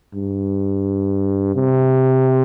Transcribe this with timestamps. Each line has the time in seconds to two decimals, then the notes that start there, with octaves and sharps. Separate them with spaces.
0.15 G2
1.55 C3